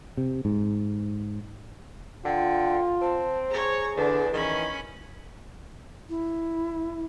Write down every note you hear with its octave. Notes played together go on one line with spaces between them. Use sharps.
C3
G#2
D3 F4 G5
C4 A5
G#4 C5 C#5 A#5
E2 D3 D4
D#3 E3 C#4 B5
E4